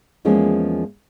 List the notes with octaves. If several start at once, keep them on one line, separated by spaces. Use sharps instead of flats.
E2 F3 G#3 A#3 C#4